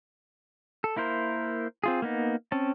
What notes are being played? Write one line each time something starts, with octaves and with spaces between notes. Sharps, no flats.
A4
A#3 E4 A#4 C5
C4 F4 G#4
A#3 B3 D#4
C4 C#4 A5